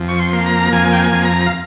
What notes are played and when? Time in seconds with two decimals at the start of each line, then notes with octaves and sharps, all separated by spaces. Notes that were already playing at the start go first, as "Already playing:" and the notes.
Already playing: F2
0.09 C#6
0.19 C6
0.33 A#3
0.46 A#5
0.73 F2 G#5
0.93 G5
0.99 G#5
1.12 F2
1.25 A#5
1.46 F5